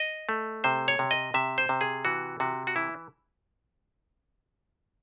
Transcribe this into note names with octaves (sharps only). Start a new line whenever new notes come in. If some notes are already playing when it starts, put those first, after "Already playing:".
Already playing: D#5
A3
C3 C5
C#5
C3
D#5
C3 E5
C5
C3
G#4
E3 F#4
C3 F#4
F#4
E3 E4